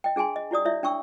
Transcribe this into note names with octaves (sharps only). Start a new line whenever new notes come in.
D#5 G5
D4 G#4 G5 G#5 C6
D#5
E4 F#4 D5 D#6
E4 C#5 D5 E5
D4 G5 C#6 E6